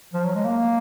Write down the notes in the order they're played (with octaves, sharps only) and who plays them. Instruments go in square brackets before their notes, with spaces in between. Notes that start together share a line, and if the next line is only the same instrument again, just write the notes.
[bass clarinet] F3
F#3
G#3
A#3